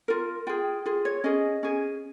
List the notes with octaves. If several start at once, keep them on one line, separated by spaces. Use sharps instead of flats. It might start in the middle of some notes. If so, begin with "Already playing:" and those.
F4 A#4
F4 G#4 G5
F4 G#4
C#5
C#4 G#4 D#5
C#4 G#4